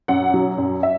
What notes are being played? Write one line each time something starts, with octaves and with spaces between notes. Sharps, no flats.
F#2 F#5
F#3
F#2
E5